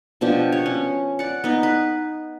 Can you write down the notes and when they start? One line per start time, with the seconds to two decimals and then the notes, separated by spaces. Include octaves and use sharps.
0.21 B2 F3 D4 G4
0.52 C#5
0.66 C#4
1.19 D5 F#5
1.44 B3 D#4
1.63 B4